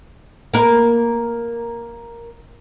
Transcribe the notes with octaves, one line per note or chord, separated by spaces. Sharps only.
A#3 A#4